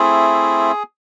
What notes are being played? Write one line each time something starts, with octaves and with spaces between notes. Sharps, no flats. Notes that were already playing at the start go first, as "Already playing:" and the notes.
Already playing: A3 C4 E4 G#4